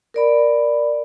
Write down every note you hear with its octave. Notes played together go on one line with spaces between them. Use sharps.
A#4 D5 B5